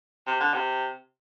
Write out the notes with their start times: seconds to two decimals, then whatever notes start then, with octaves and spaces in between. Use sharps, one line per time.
0.27 C3
0.41 D3
0.54 C3